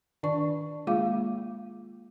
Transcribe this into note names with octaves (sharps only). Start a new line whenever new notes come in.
D#3 D4 D5 C#6
G#3 A#3 F4 G#4 F5 D6